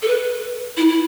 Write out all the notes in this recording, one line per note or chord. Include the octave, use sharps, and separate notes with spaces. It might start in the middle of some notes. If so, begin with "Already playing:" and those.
A4
B4
E4
E4